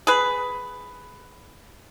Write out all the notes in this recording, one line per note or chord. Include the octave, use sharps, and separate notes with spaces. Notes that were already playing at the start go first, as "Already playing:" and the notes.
G#4 B4